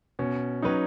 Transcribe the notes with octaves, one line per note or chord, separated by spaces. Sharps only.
B2 C#4
F#3 C#4 D#4 B4